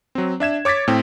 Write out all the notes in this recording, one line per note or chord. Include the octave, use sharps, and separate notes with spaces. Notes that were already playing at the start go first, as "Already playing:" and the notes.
F#3 C4
D4 E5 G#6 E7
C#5 D6 G#6 A6 B6
A2 C4 G5